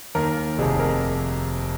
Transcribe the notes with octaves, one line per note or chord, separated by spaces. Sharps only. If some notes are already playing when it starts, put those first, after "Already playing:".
D#2 D#3 A#4
F1 F2 C3 G#4
A#4